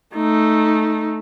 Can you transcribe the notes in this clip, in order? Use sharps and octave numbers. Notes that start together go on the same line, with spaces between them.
A3 D#4